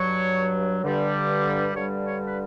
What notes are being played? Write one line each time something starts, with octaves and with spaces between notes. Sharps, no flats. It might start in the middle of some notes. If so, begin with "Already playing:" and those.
Already playing: G2 F#3 C#5
G2 D3 G3
G2 D3 G3 C#5
C#5
B4